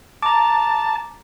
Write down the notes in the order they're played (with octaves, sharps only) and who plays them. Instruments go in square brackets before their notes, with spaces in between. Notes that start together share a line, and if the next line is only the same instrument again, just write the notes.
[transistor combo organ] A5 [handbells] A#5 D6